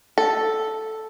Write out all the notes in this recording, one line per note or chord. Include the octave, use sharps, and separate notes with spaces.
A4